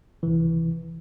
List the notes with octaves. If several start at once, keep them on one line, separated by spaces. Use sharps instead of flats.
C#2 C3 E3